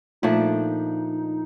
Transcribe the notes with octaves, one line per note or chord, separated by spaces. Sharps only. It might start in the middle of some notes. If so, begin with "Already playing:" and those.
A#2 F3 A3 D4 D#4